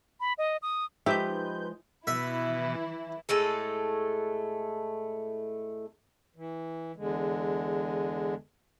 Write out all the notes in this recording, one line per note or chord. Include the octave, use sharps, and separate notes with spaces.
B5
D#5
D#6
F3 G#3 D#4 G4 B4 D#5 E5 G6
B2 E3 E4 E5
A2 G#3 A3 A4
E3
E2 D3 G#3